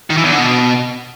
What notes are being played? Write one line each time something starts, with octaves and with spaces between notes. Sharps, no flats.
D#3
E3
E2
D3
B2